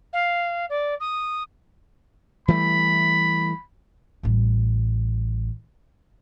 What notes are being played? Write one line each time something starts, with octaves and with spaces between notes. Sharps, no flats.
F5
D5
D#6
E3 G3 A3 B5
A1 G3